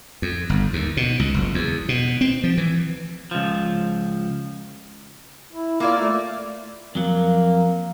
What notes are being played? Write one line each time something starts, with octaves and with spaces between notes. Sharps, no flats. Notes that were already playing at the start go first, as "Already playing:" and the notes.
F2
G1
D#2
B2
C#2
F#1
E2
B2
C4
F3
E3
C#2 F3
E4
A#3 E4 F4 D5
A3
F2 F#3 A#3